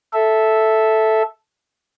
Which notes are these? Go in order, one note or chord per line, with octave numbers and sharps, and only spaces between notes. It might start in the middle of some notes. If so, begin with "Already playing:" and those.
A4 E5